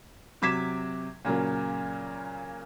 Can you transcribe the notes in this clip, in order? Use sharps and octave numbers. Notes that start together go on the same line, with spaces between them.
C3 F#3 D6 G#6 B6 E7
A#2 C#3 F#3 A#3